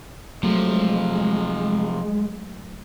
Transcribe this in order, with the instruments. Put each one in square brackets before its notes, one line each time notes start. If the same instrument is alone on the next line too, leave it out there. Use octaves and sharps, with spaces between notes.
[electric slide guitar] C3 F3 [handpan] F#3 A3 [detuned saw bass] G#3